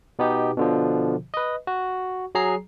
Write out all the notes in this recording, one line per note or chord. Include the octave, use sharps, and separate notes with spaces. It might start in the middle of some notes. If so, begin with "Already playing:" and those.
B2 B3 D#4 G4
B2 D3 F3
B4 D#5
F#4
F#3 G#4 A#5 C7